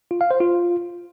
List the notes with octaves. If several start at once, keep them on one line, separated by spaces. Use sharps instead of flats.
F4
F5
C5
F4